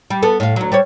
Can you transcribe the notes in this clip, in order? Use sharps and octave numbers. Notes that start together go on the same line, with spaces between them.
G3
B3 A4
A2 F5
D2 F#3
G3 C5 C#5